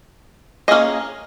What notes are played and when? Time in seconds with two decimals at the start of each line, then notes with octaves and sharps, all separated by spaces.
0.68 A#3 C#4 G#4 D#5